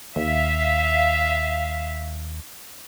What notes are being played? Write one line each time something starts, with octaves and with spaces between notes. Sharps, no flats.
D#2 E5 F5